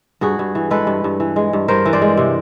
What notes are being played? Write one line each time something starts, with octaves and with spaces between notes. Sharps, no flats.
G2 F#4 G#4
G2
E3
G#3 A4 B4
G2
G2
E3
G#3
G2
G2 A#4 C5
E3
C5 D5
G#3
C3